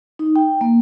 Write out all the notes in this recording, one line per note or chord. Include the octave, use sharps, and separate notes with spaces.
D#4
G5
A#3